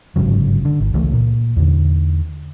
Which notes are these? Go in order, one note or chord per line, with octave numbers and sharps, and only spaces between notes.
G1 G#2 C#3 F#3
D3
G#1
C#2 E3 A3
A#2
E2 D3